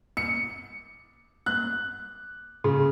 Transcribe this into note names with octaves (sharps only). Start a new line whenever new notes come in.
C#7
F#6
C#3